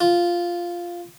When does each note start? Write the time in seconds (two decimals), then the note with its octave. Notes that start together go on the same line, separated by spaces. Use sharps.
0.01 F4